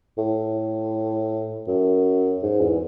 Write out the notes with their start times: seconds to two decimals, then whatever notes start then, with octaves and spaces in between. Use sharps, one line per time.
0.18 A2
1.67 F#2
2.43 G#2
2.61 E2